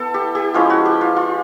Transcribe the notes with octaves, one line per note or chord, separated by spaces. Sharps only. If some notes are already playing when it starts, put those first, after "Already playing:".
Already playing: B3 E4 A4
G4
G4
F3 G#3 C#4 E4 F4
F#4
G4
F4
F4